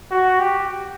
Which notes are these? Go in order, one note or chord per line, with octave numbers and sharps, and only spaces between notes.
F#4
G4